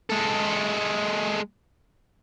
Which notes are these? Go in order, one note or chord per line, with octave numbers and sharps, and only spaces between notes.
G#3 A4